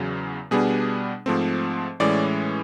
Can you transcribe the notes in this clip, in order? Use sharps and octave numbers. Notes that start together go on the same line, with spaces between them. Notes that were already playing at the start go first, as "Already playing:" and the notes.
Already playing: E2 C#3 F#3
B2 G3 B3 D4 G#4
G#2 F3 A3 C4
A2 E3 G#3 C#4 D5